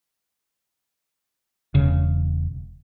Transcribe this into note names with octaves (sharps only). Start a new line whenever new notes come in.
E1 C#3